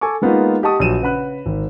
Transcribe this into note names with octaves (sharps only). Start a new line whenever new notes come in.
A4 G#5 C#6 D6
G#3 A#3 B3 D#4 F4
G4 D#5 F#5 A5 C#6 D#6
A#1 F#3 D#7 E7
C#3 B4 F#5 B5 F#6
G#1